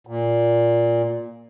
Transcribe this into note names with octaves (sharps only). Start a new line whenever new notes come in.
A#2